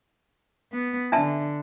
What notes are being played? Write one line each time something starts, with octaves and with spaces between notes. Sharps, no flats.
B3
D3 D4 E5 A5